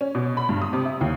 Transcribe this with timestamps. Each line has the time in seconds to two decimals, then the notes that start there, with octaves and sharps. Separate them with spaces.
0.01 C#4
0.15 B2
0.37 B5
0.49 G2
0.62 D#6
0.73 C3
0.85 E5
1.01 D#2